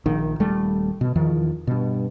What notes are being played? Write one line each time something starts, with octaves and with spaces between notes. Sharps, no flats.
A#1 D#3
D#1 G3 A3
B2
E2 D#3 F3
G2 B2